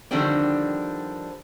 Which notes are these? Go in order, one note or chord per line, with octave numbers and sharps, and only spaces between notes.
D3 D#3 F3 G3 C4 D4